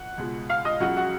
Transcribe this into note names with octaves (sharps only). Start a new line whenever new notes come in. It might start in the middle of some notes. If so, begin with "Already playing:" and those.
Already playing: F#5 F#6
C#2 B2 G#3
F5 F6
D#5 D#6
C#2 C#3 F#3 F#4 F#5
F#4 F#5